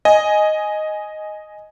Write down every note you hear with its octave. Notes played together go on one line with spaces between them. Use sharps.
D#5 G#5